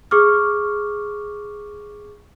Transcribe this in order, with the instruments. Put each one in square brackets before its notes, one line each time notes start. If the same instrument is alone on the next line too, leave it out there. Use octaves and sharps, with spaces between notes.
[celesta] G#4 C#6 D6 F6